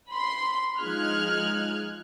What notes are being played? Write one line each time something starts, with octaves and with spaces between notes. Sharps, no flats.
B5 C6
F3 G#3 D#4 F6 F#6 G#6